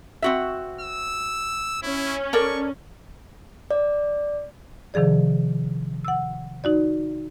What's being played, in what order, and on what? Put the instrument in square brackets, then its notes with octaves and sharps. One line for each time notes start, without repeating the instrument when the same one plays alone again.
[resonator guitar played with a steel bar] C4 F#4 E5
[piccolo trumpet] E6
[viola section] C#4 [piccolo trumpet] E4
[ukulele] A4 A#4 D5 [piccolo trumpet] C#6
[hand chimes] D5
[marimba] C3 D#3 F3 G#4 D5
F#5 E6
D#4 F#4 D5